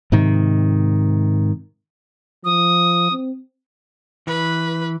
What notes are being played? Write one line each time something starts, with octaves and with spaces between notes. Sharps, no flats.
G#2 C3 D#3
F3 D#6
C4
E3 B4